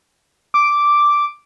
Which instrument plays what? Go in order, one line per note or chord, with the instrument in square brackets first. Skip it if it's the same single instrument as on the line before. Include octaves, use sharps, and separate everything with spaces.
[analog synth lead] D6